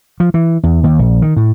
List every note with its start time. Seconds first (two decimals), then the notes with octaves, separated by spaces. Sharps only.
0.20 F3
0.34 E3
0.63 E2
0.84 D#2
0.99 A#1
1.22 D#3
1.37 A2